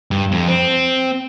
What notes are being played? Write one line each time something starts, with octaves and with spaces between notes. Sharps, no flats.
G2
F2
C4